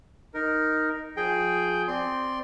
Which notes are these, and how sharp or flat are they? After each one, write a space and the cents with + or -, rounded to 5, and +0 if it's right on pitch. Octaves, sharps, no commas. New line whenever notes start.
D#4 +0 A#4 +0
F3 +25 G#4 +10 G5 +0
C4 +0 D5 +0 C6 +0